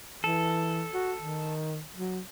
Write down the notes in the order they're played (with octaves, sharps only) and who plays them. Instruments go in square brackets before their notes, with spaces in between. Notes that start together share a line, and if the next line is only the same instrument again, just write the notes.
[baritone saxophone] E3 [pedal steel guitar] A4
[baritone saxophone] F#4
D#3
F#3